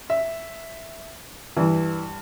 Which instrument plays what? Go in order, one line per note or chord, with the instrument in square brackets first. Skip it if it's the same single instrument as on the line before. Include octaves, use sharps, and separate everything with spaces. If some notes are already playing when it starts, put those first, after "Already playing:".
[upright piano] E5
[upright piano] G2 [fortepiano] E3